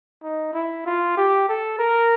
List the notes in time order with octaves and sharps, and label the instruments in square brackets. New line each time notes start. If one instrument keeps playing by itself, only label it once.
[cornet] D#4
E4
F4
G4
A4
A#4